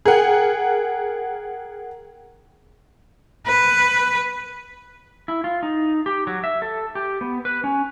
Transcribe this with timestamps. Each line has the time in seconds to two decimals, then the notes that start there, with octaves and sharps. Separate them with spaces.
0.05 G#4 A#4 F#5 G5
3.46 B4
5.28 E4
5.44 F4
5.63 D#4
6.06 G4
6.27 F#3
6.44 E5
6.62 A4
6.95 G4
7.21 B3
7.45 B4
7.64 C#4